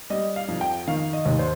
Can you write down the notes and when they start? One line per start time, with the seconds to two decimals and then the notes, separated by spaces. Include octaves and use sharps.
0.10 G3 D#5
0.36 F5
0.48 F2
0.61 G5
0.87 D#3 F5
1.13 D#5
1.26 D#2
1.39 C5